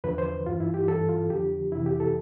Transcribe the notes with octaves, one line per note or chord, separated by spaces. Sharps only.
E2 D3 F3 B4
C5
G2 E3 F4
E4
G4
G2 E3 A4
F4
F2 D3 F3 G4
F2 C3 E3 E4
G4
A4